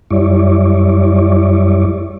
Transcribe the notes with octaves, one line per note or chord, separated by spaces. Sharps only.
F#2 G3 E4 C#5 D5